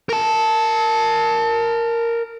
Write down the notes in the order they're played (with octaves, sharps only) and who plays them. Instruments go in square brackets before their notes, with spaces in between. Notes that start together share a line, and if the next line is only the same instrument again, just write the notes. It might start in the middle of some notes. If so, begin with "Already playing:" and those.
[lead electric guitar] A#4 A5